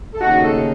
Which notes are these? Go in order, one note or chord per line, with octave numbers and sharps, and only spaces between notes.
A4
D#2 C#3 A3 D#4 F#4
A4